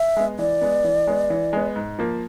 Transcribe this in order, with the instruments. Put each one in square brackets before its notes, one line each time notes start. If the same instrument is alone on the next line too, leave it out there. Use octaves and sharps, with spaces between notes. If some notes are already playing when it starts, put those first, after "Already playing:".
Already playing: [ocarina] E5
[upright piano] G#3 B3
[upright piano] E3 [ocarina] D5
[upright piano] G#3 B3
E3
G#3 B3
E3
G#3 B3
G#2
F3 A#3